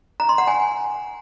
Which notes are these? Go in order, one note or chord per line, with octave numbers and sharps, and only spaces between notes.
A#5
C6
F#5
G#5